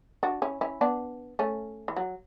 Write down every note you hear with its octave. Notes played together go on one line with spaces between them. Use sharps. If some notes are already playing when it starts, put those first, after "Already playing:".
D4 F#4
C#4 E4
C#4 E4
B3 D4
A3 C#4
E3
F#3